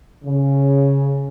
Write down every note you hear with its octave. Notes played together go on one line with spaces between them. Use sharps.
C#3